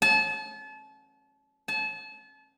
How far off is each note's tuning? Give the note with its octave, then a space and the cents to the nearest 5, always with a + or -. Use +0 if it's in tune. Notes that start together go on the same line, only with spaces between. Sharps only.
A5 -35
A5 -35